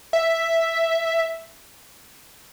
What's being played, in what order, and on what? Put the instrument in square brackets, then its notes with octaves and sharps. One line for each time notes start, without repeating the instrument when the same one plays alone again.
[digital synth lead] E5